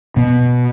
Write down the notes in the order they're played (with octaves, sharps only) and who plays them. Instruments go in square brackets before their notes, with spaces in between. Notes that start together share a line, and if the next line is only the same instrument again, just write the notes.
[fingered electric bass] B2 B3